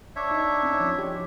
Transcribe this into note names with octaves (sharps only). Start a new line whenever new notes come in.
D4 C#5 E5
D#4
C4 C#4
F3
G4